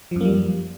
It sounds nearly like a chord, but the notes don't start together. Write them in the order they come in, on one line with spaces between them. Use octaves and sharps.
F3 F#2 A#3 G3